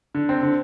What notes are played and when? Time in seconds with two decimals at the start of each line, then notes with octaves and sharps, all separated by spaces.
0.15 D3
0.29 C4
0.43 D3